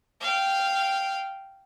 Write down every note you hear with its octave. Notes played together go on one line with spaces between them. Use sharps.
F5 G5